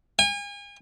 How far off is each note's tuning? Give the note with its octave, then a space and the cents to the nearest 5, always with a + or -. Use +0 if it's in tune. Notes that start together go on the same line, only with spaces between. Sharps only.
G#5 -40